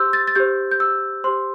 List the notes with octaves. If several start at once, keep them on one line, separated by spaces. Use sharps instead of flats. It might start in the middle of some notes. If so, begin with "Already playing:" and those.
Already playing: G4 C5 C6 E6 G6
A6
A6
G4 C5 G6
G6
E6
G4 C5 C6